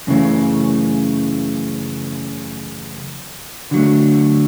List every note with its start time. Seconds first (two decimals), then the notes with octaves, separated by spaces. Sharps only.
0.07 F#2 C#3 E3 A3
3.71 D3 F#3 A3